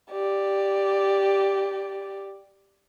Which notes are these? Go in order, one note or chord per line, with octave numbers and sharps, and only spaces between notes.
G4 D5